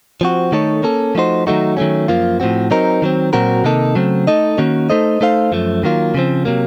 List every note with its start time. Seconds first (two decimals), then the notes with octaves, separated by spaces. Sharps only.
0.21 F3 C4 F#4
0.52 D#3 A3 D#4 A4 C#5
0.83 A#3 C#4 A4
1.15 F3 A3 D#4 F#4 C5
1.47 D#3 F#3 A3 D#4 F#4
1.77 D#3 F#3 A3 C#4
2.08 F#2 F3 A#3 F4
2.40 A2 F3 C4 F#4
2.71 F#3 C4 D#4 A#4
3.02 D#3 F#3 C4
3.33 A#2 F#3 C4 F#4 A#4
3.64 C3 D#3 A#3 D#4 A4
3.95 C#3 F#3 A3 C4
4.27 A3 D#4 A4 D#5
4.58 D#3 A#3 C#4 F#4
4.90 A3 D#4 A4 C5 D#5
5.21 A3 D#4 A4 C5 F5
5.52 F#2 F3 A3
5.83 D#3 F#3 A#3 F4
6.15 C#3 F3 C4
6.45 C3 F#3 A#3